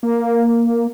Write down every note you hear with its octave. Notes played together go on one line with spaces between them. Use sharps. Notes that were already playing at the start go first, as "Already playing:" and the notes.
A#3